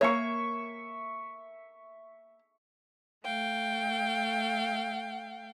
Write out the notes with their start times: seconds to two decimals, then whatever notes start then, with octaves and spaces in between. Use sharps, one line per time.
0.01 A#3 C#5 E5 C#6
3.24 A3 F5 G5